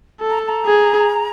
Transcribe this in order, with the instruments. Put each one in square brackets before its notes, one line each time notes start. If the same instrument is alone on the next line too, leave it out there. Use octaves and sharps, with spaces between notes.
[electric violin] A4
[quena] A#5
A5
A#5
[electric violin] G#4